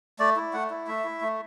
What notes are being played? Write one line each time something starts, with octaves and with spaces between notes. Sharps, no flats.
A3 D5
E4
A3 F#5
E4
A3 E5
E4
A3